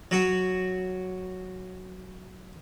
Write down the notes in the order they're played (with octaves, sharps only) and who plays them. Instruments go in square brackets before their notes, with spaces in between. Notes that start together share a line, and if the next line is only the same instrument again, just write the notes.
[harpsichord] F#3 F#4